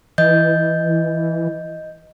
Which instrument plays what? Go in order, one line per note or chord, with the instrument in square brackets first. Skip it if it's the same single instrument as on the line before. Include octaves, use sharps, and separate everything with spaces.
[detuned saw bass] E3 [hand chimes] D#5 G6